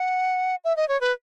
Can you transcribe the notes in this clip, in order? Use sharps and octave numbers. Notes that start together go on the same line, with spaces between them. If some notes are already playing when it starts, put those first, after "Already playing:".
Already playing: F#5
E5
D#5
C#5
B4